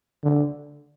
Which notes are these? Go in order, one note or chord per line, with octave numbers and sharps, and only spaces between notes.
D3